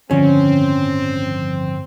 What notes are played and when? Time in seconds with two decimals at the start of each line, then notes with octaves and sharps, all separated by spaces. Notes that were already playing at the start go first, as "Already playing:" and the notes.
0.11 G1 A2 D3 D#3 F3 C4 C#4